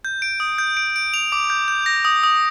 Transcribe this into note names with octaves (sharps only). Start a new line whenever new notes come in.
G6
D7
D#6
G6
D7
D7
F7
D6
G6
G6
A#6
D#6
D#6